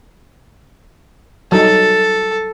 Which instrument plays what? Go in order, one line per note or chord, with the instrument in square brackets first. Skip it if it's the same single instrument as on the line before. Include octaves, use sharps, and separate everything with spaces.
[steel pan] F#3 G3 D#4 [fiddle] A4